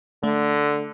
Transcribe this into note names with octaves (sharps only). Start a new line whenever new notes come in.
D3 A3